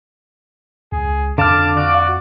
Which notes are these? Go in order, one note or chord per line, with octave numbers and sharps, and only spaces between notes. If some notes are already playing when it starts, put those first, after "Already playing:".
C#2 G#4
F2 D3 F5 A5 D6 F6
F#4 D5